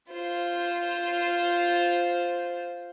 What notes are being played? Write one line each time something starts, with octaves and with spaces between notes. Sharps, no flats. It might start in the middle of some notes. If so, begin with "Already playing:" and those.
F4 C5